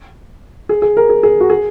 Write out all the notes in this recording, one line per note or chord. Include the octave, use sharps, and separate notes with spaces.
G#4
G#4
A#4
G#4
G#4
F#4
G#4